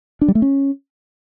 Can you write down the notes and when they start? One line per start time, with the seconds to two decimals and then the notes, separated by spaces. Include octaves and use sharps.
0.22 D4
0.28 G3
0.35 A3
0.42 C#4